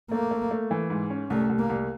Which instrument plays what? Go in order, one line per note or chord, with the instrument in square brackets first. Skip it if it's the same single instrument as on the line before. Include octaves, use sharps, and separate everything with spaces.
[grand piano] A3 [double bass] A#3
[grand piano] A3
A3
E3
G#2
C#4
[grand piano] C2 [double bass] A3
[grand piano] C2
[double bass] A#3
[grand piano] C2